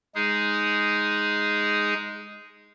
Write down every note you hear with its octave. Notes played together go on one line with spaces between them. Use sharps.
G#3 D#4 G#4